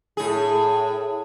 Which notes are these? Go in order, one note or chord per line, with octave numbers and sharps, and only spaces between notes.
A2 G#4